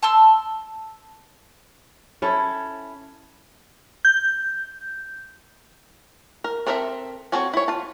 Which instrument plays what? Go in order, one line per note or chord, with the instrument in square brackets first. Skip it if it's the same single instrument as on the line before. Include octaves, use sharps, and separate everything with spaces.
[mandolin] A5 C6 E6
[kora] C#4 E4 A4
[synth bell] G6
[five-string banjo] A#4
C4 A4 A#4 D5 E5
C4 F#4 A4 C#5 G#5
E4 C#5
F4 A5